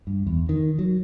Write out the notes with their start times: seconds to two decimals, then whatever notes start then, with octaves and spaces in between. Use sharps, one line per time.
0.07 G2
0.27 E2
0.49 D#3
0.79 F#3